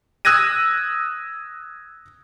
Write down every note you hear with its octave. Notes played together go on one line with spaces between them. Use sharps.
D#6 E6 F#6 G#6 A#6 D#7